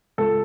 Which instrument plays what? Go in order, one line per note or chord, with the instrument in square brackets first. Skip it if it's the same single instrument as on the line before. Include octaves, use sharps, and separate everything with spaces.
[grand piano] C#2 A4